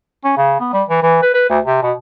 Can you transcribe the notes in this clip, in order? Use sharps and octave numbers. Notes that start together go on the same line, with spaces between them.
C#4
C#3
B3
G3
E3
E3
B4
B4
D2
C3
B2